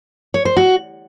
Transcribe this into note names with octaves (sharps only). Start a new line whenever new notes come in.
C#5
C5
F#4